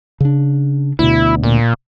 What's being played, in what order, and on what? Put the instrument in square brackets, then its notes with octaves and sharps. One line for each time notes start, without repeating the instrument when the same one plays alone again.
[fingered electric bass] C#3 D4
[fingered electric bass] D2 B2 [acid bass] E4
[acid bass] A#2